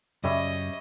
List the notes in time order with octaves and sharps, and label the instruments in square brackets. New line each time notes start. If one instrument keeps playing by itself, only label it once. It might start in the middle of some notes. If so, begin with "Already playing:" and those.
[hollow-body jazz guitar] F#2 C#3 [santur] G3 C#5 E5 [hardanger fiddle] D#5